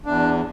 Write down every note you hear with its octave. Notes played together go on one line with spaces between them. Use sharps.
E2 D4